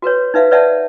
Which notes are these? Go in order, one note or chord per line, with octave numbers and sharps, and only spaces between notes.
F#4 A#4 B4 C#5
D#4 B4 E5 F5
B4 C#5 D5 E5 F#5 A5